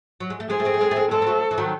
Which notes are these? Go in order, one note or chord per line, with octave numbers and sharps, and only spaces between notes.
F#3
G#3
A3
G#3 C4 G#4
A3
G#3 C4
A3
G#3 C4
A3
G#3 C4
G#3 C4 A4
C4
F#3 A3
E3
D#3 F#3